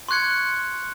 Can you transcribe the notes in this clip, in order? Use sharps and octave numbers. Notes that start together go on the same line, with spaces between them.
C6 C#6 F#6 G#6 C#7